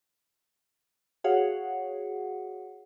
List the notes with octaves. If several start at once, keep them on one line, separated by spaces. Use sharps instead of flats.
F#4 G#4 C#5 F5 F#5